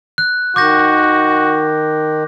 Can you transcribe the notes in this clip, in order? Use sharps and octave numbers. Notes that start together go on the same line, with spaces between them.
F#6
D#3 F#4 D6 G6 A#6